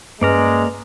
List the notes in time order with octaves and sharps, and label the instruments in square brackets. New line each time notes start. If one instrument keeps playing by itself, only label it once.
[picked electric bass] G2 C#4 [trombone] G#3 [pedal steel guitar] A#3 D5 A#5 [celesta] B4 F6